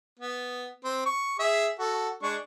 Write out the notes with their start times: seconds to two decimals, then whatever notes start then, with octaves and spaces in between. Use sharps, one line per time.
0.19 B3
0.84 C4
1.06 C#6
1.39 G#4 E5
1.79 F#4 A4
2.23 G#3 D4 C#6